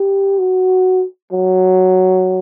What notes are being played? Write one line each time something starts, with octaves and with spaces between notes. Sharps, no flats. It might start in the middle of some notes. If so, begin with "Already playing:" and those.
Already playing: G4
F#4
F#3